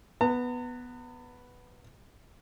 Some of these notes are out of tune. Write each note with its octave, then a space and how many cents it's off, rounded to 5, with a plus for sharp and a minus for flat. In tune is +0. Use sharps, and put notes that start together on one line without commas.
B3 +0 A#5 -45